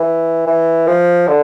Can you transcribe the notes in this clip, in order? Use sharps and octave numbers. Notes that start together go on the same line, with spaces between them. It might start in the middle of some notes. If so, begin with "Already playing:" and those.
Already playing: E3
E3
F3
D3